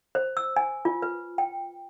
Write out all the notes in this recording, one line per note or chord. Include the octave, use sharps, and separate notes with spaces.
C5
E6
G#5
F4
B4
G5